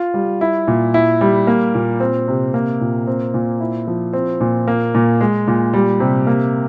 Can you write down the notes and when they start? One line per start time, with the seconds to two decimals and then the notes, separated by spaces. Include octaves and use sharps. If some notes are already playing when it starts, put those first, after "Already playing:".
Already playing: F4
0.14 G3
0.41 E4
0.67 A#2
0.94 E4
1.21 G3
1.47 A#3
1.75 A#2
2.00 C4
2.28 C3
2.54 A#3
2.81 A#2
3.07 C4
3.34 A#2
3.60 E4
3.87 F3
4.13 C4
4.40 A#2
4.68 A#3
4.95 A#2
5.21 G#3
5.47 A#2
5.73 G3
6.00 C3
6.27 A#3